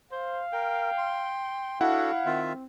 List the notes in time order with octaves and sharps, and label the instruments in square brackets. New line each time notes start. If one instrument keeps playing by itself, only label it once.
[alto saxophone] C5 [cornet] F5
[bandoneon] A#4 [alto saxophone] G5
[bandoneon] C6
[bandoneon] D4 F#4 A4 [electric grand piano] E4 F#5 [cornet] F5
[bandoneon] D#3 F4 E5 [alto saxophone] C4